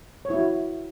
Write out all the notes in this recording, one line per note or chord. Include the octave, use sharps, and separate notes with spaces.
C#5
E4
F#4